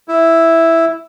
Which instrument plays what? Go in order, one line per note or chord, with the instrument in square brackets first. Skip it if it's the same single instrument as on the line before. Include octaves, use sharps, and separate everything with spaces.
[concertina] E4